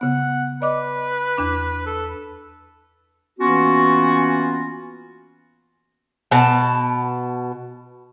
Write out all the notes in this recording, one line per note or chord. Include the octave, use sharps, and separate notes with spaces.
C#3 B3 F#5
B4 D5 D#5 D6
E2 D4 D6
A4
E3 A#3 B3 C#4 F4 F#4
B2 A5